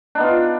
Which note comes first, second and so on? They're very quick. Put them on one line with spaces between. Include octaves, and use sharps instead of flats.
D4 D#4 B3 F4